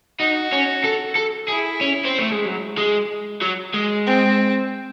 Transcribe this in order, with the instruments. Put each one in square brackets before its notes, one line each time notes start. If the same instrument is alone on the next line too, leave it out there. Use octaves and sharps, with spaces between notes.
[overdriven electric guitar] D#4 [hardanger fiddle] F#4
[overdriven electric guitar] C#4
A4
A4
[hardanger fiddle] E4 [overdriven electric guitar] G#4
[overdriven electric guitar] C#4
C4
A3
G#3
F#3
G#3
F#3
G#3
[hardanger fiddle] C4